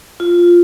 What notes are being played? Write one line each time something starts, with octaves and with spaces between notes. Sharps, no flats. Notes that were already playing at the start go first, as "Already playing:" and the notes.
F4